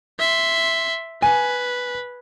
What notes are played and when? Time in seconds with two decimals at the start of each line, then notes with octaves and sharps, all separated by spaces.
0.19 E5 C6
1.22 B4 G#5